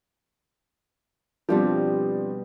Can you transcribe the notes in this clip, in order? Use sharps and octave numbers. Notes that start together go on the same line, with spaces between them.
B2 F3 G3 C4 D4 G4